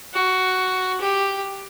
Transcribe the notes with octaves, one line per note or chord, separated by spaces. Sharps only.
F#4
G4